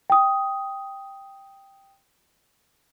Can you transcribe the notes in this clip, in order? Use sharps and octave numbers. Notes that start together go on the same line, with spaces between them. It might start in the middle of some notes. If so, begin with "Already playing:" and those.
G5 D#6